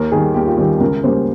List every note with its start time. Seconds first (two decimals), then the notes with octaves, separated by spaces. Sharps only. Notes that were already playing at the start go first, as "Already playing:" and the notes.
Already playing: D#2 A#4
0.12 D#3 G3 G#4
0.34 D#2 G4
0.46 F4
0.58 D#3 G3 G4
0.80 C#2 A#4
1.04 C#3 G3 A#3 C#4 C5